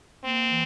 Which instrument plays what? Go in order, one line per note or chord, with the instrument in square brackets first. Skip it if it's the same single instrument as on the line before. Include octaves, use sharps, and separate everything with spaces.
[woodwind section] A#3 [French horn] C4
[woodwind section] E3